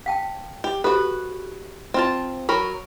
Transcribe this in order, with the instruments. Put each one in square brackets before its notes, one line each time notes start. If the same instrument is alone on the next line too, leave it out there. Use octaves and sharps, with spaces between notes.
[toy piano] F5 G5 A5
[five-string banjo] G4
[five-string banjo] F#4 B4 [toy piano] G4 A4 C5
[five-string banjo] C4 F4 A5
[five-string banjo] F#3 A#4 B5 [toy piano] C#6